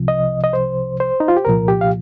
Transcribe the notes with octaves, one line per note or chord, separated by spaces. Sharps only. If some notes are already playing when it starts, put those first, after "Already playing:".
Already playing: C2 C3 F3
D#5
D#5
C5
C5
D#4
F4
G4
C2 A#2 F3 A#4
G4
F5